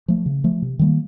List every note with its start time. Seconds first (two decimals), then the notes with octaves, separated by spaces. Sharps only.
0.08 F3 A3
0.26 C#3
0.44 F3 A3
0.62 C3
0.79 D#3 G3 A#3